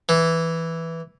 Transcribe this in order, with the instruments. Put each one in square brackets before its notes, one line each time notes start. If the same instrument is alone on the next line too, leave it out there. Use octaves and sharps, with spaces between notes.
[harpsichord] E3